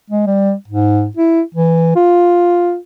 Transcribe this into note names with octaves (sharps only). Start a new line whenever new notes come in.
G#3
G3
G#2
E4
E3
F4